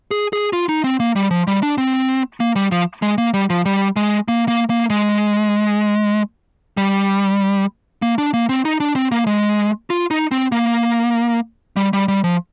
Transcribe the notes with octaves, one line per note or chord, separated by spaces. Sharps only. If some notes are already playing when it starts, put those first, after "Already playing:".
G#4
G#4
F4
D#4
C4
A#3
G3
F3
G3
D4
C4
A#3
G3
F3
G#3
A#3
G3
F3
G3
G#3
A#3
A#3
A#3
G#3
G3
A#3
D4
A#3
C4
D#4
D4
C4
A#3
G#3
F4
D#4
C4
A#3
G3
G3
G3
F3